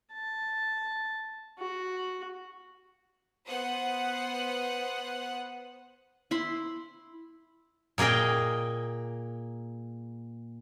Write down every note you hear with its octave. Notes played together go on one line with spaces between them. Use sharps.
A5
F#4
B3 C5 F#5 D#6 F#6
E4 B5 C6
A#2 A#3 G#4 D#5 G5